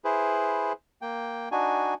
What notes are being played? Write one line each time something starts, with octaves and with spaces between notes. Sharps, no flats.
E4 G#4 B4 C5
A#3 G5
D4 D#4 F#4 G#5